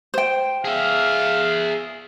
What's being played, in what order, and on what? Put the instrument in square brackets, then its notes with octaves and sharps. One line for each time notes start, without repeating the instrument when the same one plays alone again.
[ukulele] C5 G5
[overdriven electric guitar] G#4 E5 [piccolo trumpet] F5